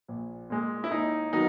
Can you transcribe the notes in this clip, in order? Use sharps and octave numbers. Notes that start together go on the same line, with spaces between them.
A#1
A#2 G#3
E4
D#2 D#4
D#3 F#3 B3 D#4